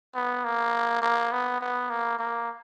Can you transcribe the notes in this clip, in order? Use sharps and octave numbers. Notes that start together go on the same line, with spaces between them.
B3
A#3
A#3
B3
B3
A#3
A#3